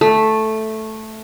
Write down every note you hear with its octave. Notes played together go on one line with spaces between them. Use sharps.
A3